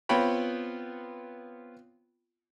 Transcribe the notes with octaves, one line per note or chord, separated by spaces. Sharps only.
B3 C4 F4 C#5 G5 B5